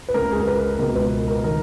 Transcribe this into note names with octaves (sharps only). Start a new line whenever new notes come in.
B4
C#2 C#3 A#4
G#4
A#4
B4
C#2 B2 A#4
B4
A#4
D#3 A#4